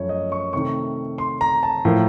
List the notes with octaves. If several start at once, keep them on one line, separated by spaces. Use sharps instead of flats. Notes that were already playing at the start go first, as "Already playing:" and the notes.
Already playing: F#2 F3 A3 C#5
D#5
C#6
C3 D#3 A3 C#6
C6
A#5
A5
A2 F3 A#3